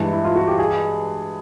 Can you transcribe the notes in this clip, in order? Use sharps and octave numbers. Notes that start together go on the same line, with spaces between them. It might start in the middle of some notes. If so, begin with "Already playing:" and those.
Already playing: G2 E3 G#3
E4
F4
F#4
G4
G#4